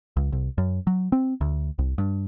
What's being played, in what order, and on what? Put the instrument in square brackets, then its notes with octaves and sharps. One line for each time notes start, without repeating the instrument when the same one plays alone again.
[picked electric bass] C#2
C2
F#2
F#3
C4
D2
C2
G2